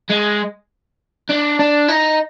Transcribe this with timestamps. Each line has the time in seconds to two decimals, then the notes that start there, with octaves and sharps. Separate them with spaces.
0.10 G#3
1.29 D4
1.59 D4
1.89 D#4